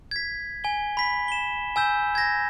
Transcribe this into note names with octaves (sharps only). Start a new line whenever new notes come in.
G#6 B6
G#5 G7
B5 B6
E7 G7
G#5 E6 G6 E7
G#6 A#6